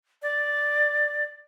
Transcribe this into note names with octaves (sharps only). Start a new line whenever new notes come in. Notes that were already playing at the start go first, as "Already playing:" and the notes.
D5